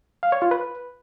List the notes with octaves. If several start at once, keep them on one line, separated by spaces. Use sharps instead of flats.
F5
C#5
F4
B4